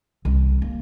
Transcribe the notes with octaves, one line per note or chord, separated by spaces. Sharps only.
C2
A#3